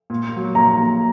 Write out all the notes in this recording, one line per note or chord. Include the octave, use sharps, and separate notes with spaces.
A#2
F#3 A#3
A#2 A#5
F#3 A#3